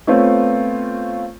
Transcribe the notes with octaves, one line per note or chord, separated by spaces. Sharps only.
A3 B3 C4 F4 C#5